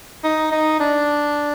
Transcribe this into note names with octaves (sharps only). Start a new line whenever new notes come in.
D#4
D#4
D4